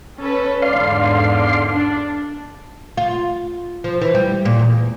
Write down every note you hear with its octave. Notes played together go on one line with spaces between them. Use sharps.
C#4 A4 B4
E2 G#2 D3 D5 F5 C6
D4
F4
F3
E3
G3
A#2
E2